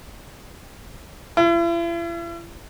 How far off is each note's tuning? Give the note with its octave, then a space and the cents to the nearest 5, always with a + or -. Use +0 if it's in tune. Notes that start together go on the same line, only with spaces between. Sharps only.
E4 +45